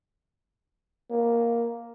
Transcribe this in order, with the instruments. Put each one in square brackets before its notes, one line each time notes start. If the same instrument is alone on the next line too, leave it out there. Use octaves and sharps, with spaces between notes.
[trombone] A#3